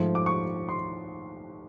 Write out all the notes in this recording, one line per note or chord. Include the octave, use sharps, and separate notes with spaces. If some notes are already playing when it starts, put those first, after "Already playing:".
Already playing: G#2 F3 A3
D6
C#6
C6